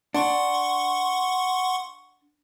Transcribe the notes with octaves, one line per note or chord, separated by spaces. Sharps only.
D4 F#5 C6 C#6